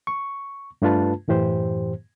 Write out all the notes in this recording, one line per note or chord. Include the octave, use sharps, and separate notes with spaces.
C#6
G2 A3 D4 F4 B4 A5
F#2 A2 E3 G4 C5